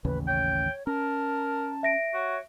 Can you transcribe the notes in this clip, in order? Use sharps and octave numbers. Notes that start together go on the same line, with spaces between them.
A1 D#2 C#3 B4
C#5 G5
C#4 A#4 A5
E5 A#6 D7
F#4 C#5